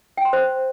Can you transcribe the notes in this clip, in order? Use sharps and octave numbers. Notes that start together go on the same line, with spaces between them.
G5
C6
C5